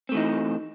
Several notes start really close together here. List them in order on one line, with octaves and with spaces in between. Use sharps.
C4 A3 E3 D#4